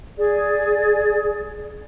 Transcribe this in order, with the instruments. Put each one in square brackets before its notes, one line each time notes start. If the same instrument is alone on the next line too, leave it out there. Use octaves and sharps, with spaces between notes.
[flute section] G#4 D5